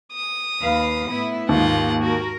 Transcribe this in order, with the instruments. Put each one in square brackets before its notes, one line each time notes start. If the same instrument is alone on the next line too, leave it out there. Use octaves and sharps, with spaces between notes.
[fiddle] D#6
[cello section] D#2 B4 F5
A2 B3 E4
[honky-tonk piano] D#2 [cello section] G#2 D#3 [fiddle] F4 F#5
[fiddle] F#4 [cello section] A#4